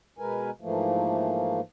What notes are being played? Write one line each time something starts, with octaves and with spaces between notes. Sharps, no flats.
B2 G#3 A#4 B4 G#5
G#2 E3 F3 A3 A#3